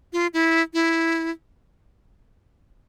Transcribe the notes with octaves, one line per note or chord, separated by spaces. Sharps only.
F4
E4
E4